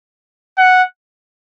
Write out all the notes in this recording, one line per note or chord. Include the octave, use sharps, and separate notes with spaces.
F#5